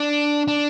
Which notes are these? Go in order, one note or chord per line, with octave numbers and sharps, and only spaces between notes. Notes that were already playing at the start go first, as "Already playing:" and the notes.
Already playing: D4
D4